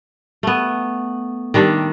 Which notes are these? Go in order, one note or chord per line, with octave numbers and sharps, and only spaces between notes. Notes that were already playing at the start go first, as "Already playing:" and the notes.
A3 B3
D#3 G3 D4 E5